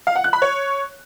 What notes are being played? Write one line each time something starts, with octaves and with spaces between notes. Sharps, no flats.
F5
F#5
F#6
B5
C#5